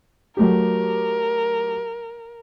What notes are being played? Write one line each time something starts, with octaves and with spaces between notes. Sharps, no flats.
F#3 A3 G4 A#4